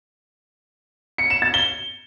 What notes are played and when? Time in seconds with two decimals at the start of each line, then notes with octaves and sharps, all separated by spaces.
1.18 C#7
1.30 E7
1.42 A6
1.54 G7